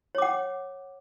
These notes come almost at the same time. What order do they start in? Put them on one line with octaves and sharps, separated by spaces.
C#5 D6 F#5